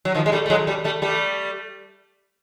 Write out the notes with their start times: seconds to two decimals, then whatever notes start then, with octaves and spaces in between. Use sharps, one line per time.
0.05 F#3
0.15 D#3 F3
0.26 G#3
0.32 G3 A3
0.46 A3
0.50 F#3 G#3
0.67 G3 A3
0.84 G3 A3
1.02 G3 A3